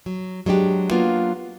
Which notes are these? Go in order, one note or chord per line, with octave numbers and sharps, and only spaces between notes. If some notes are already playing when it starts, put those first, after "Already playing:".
F#3
F#3 G#3 D4 G4
F#3 A#3 B3 D4 F4 F#4